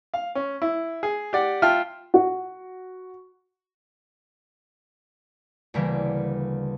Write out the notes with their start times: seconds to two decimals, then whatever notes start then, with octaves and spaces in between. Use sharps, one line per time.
0.14 F5
0.35 C#4
0.62 E4
1.03 G#4
1.33 G4 D5 F#5
1.62 F4 E5 F5 G5 A5 F6
2.14 F#4
5.74 D2 C#3 E3 G3 A#3